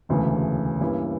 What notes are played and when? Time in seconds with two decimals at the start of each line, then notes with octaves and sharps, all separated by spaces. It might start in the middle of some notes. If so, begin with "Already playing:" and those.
0.09 E1 D2 C#3 E3 A3
0.80 G2 E3 A#3 C#4 E4